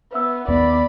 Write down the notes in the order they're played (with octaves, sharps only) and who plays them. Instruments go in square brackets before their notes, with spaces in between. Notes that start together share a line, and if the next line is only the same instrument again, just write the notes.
[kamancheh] B3 [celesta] B4 E5 E6
[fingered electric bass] D#2 B3 [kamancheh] D5 B5